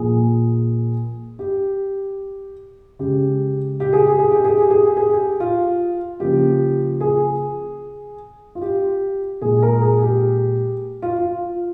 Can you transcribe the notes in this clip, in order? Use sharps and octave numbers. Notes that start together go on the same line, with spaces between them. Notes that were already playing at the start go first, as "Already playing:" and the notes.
Already playing: A#2 F3 A#3 G#4
G4
C#3 G#3 G4
G4
G#4
G4
G#4
G4
G#4
G4
G#4
G4
G#4
G4
F4
C#3 F3 A#3 G4
G#4
F4
G4
A#2 G#3 G#4
A#4
G#4
G4
F4
F4